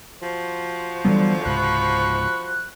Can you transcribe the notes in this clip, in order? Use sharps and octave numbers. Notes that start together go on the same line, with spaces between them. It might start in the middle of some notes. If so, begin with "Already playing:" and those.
F3 F#4 C5
D3 E3 F#3 G3 B3
C#2 G#2 C3 B5 C#6 F#6